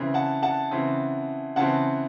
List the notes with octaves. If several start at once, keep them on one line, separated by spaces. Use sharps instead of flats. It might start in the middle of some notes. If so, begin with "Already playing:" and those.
Already playing: C#3 E3 C4
F#5 A5
F#5 A5
C#3 E3 C4
C#3 E3 C4 F#5 A5